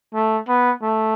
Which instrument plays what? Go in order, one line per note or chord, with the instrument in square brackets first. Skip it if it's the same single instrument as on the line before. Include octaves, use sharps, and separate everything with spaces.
[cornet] A3
B3
A3